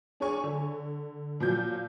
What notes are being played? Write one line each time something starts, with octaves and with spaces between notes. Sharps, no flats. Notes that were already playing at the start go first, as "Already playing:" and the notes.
D4 G#4 C#5 D5 G#5 C#6
D3
A#2 F3 F#3 G6